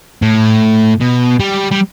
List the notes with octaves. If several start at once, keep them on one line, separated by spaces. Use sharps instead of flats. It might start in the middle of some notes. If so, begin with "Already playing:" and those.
A2
B2
G3
G3